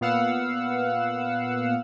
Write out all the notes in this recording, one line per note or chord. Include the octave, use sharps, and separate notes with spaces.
A#2 B3 F5 F#5 E6